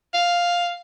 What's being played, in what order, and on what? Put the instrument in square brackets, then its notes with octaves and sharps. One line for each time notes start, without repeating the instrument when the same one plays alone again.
[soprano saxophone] F5